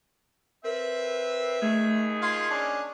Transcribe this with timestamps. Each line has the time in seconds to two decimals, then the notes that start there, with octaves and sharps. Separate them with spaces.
0.65 C4 A#4 B4 E5
1.62 D#2 D#3 A3 G#4
2.22 F4 C6 G#6
2.51 C#4 D4